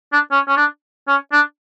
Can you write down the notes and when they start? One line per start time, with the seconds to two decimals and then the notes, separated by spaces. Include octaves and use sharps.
0.13 D4
0.32 C#4
0.48 C#4
0.57 D4
1.08 C#4
1.32 D4